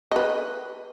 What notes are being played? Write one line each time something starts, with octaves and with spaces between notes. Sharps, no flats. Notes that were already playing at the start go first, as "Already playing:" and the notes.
B4 D#5